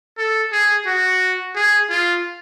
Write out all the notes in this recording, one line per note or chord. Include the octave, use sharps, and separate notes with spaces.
A4
G#4
F#4
G#4
F4